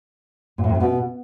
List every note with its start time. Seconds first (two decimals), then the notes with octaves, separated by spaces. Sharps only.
0.58 A#2
0.64 A2
0.69 F2
0.75 A2
0.80 B2